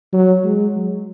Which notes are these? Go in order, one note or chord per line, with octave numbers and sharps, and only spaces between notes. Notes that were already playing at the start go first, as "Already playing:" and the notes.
F#3
G#3
F#3